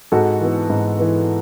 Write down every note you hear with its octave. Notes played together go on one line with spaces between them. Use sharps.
G#2 F#4 A4
E3 B3
G#2
E3 B3